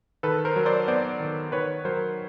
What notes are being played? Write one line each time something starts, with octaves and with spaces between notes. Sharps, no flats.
D#3 A4 B4
A#4 C5
F#3
C5 D5
B3 C5 D5
D#3
D#3 B4 C#5
F#3 A#4 C5